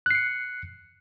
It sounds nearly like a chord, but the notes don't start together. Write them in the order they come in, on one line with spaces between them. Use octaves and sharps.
F#6 C7 C#7